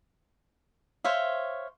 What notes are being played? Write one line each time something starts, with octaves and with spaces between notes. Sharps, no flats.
C5 C#5 E5 F5